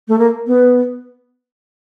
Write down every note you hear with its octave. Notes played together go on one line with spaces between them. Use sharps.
A3
A#3
B3